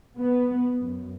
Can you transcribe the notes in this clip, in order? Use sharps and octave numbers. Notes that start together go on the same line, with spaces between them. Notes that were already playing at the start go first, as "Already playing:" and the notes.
B3
F#2